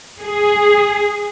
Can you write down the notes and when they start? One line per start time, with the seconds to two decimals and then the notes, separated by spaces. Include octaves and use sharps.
0.21 G#4